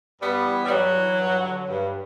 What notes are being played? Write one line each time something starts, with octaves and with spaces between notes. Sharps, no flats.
G2 G3 B3
E3
G3
G2 F#3
E3
G2
D3
G2